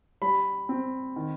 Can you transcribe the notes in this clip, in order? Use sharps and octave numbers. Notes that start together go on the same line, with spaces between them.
G3 B5
C4
D#3